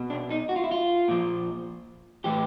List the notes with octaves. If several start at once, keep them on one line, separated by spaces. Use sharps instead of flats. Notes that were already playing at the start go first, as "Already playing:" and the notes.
Already playing: B2
D4
D#4
F#4
F4
E4
F4
A#2 F3
A2 E3 G4